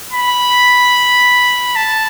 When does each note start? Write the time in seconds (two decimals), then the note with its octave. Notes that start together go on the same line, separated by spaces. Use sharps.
0.13 B5
1.76 A5